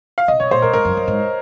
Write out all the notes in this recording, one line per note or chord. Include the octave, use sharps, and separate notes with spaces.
F5
C3 D#5
C3 C#5
A#2 C5
G#2 A#4
G#2 A#4
F#2
F#2
G#2